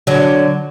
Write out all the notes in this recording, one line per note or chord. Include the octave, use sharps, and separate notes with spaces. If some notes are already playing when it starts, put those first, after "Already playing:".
D3 F#3